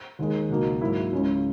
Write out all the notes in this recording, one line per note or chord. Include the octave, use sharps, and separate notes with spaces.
D#2 D#3 G#3
C#2 B2 A#3 D#4
G#2 F#3 A#3 E4
C#2 C#3 G#3 C#4 E4